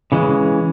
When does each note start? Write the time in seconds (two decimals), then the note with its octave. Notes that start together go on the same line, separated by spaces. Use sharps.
0.12 C#3 E3 G#3